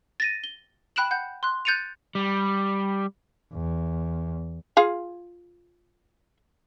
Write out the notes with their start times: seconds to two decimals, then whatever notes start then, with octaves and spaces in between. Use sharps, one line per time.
0.20 A6 A#6 D#7
0.44 G7
0.96 G5 B5 F#6 D7 E7 F#7
1.11 F#5 G6
1.43 C6 F#6
1.65 F#6 G6 A6 C#7 D#7 F7
2.15 G3
3.54 E2
4.77 F4 G#4 F5